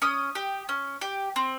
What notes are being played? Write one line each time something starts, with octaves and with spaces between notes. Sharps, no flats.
C#4 D#6
G4
C#4
G4
C4